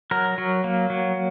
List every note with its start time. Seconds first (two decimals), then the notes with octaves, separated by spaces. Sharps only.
0.11 F#3 A#4
0.38 F#3
0.64 A#3
0.90 F#3